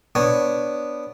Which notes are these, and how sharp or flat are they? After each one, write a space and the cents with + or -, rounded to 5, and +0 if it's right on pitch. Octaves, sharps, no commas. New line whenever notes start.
B3 +0 D4 +0 C#5 -10